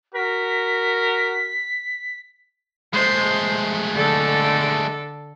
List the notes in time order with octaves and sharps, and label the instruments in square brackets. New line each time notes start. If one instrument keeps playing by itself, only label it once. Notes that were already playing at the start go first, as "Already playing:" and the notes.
[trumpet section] F#4 A#4 [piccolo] B6
[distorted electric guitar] G#3 A3 [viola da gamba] C5
[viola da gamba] D3 A4